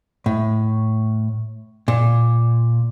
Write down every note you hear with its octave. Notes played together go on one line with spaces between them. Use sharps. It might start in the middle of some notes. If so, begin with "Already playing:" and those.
A2
A#2